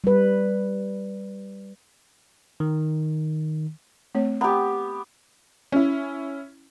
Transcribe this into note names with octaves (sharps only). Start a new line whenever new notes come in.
G3 B4
D#3
A3 C4 C#5
B3 G4 A#5
C#4 E4